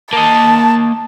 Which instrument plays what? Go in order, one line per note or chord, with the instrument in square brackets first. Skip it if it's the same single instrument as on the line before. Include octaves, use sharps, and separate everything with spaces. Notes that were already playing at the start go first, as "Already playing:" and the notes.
[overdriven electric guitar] A#3 D#5 [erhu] A5